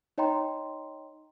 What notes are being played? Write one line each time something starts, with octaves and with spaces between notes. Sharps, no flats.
D#4 C#5 D#5 G5 A#5 C6